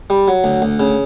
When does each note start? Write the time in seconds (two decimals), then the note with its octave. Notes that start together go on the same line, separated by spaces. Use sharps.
0.10 G3
0.28 F#3
0.44 D2
0.62 D2
0.80 C#3